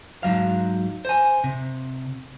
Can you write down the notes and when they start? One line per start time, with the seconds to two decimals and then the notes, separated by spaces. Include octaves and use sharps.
0.23 G#2 C3 F#3 F5
1.05 C5 G#5
1.44 C3